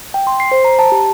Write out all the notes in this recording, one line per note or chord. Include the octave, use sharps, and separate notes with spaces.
G5
C6
C7
C5
A#5
A5
G4